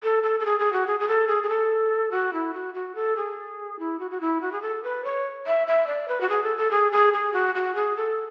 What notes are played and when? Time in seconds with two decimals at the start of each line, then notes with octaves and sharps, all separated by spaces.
0.03 A4
0.23 A4
0.40 A4
0.45 G#4
0.59 G#4
0.73 F#4
0.87 G#4
1.00 G#4
1.08 A4
1.28 G#4
1.43 G#4
1.49 A4
2.11 F#4
2.33 E4
2.54 F#4
2.74 F#4
2.95 A4
3.17 G#4
3.79 E4
3.99 F#4
4.11 F#4
4.21 E4
4.41 F#4
4.52 G#4
4.62 A4
4.84 B4
5.04 C#5
5.46 E5
5.67 E5
5.87 D5
6.08 B4
6.21 F#4
6.29 G#4
6.43 A4
6.57 A4
6.71 G#4
6.92 G#4
7.13 G#4
7.33 F#4
7.55 F#4
7.75 G#4
7.96 A4